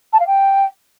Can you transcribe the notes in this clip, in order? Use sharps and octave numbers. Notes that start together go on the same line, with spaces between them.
A5
F5
G5